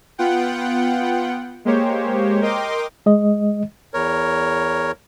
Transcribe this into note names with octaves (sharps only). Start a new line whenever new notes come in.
B3 F4 F#5 G5
G#3 A#3 G4 C5 C#5
A#4 D#5 G5 C6 D6
G#3 D#5
E2 A#4 C#5